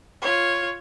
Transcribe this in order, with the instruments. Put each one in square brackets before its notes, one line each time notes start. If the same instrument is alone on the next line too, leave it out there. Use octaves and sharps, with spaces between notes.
[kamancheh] F4 C#5